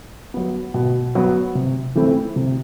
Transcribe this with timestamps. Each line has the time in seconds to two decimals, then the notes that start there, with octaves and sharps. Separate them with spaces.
0.34 F#3 B3
0.74 B2
1.15 F#3 B3
1.55 C3
1.95 E3 A3 C4 E4
2.36 C3